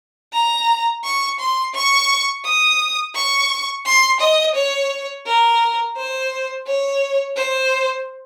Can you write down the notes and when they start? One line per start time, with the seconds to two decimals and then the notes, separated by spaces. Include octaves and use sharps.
0.33 A#5
1.04 C#6
1.39 C6
1.74 C#6
2.45 D#6
3.15 C#6
3.85 C6
4.20 D#5
4.55 C#5
5.26 A#4
5.97 C5
6.67 C#5
7.36 C5